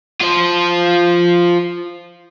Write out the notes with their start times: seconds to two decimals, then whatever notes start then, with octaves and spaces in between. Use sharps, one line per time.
0.21 F4 C5